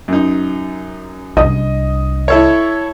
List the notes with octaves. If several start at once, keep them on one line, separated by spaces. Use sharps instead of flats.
F#2 D#4
C2 D4 D#5
E4 A4 C#5